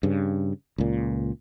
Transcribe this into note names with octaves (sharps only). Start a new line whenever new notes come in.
G2 C#3
C#2 A#2